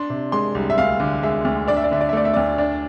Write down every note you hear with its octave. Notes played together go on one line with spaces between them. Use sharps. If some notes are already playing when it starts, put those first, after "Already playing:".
Already playing: D4 C6
C3
G#3 C6
C2
E5
D2 F5
D3
G#3 E5
D2
D4 D5
E5
D5
D3 E5
D5
E5
A3 D5
E5
D2 D5
D4 D5